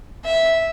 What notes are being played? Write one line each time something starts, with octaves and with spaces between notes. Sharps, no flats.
E5